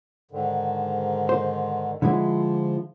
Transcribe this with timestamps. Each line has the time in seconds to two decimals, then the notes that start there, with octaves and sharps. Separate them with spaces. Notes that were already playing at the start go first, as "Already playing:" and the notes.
0.31 G#2 D3 D#3
1.29 C5
2.02 D3 F3 G#3 E4